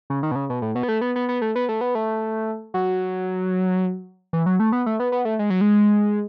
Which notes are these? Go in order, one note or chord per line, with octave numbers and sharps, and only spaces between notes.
C#3
D#3
B2
C#3
B2
A2
B2
B3
A3
B3
B3
B3
A3
B3
A3
B3
A3
F#3
E3
F#3
A3
B3
A3
B3
B3
A3
G#3
F#3
G#3